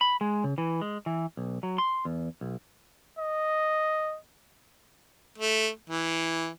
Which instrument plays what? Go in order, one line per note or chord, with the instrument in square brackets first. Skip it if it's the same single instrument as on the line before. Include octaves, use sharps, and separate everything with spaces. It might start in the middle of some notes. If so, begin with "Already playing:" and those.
[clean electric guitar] B5
G#3
C#3
E3
G#3
E3
B1
F#3
C6
E2
B1
[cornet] D#5
[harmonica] A3
E3